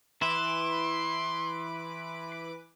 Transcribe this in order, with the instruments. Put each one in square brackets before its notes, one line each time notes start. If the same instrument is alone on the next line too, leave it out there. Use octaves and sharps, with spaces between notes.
[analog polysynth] E3 B4 D6 [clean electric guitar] E4 [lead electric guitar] C6